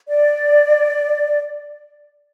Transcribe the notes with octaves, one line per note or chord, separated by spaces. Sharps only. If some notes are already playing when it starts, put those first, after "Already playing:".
D5